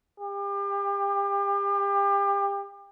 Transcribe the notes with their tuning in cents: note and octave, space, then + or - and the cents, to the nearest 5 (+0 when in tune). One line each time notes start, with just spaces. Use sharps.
G4 +30